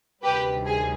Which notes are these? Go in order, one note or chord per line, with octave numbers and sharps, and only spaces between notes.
D2 C3 D#3 G3 G4 B4
G#4